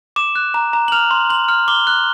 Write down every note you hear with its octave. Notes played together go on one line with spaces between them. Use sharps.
D6 E7
F#6
A#5
A#5
F#7
F6 F7
C6
C6 F#7
F6
D6 G7
F#6